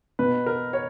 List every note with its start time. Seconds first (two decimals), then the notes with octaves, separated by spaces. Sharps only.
0.19 B2 B4
0.46 A#4
0.73 C#5